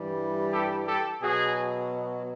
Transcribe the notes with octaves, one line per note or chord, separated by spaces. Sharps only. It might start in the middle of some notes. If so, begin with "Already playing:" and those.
Already playing: G2 E3 G3
G4 A4
G4 A4
B2 F#3 F#4 G#4